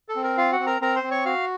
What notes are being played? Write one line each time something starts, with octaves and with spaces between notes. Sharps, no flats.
A4
C4
A#4
F4 F5
F#4 F#5
C4
A#4 A#5
C4 A#4 A#5
C5 C6
C4
C#5 C#6
F#4 F5 F6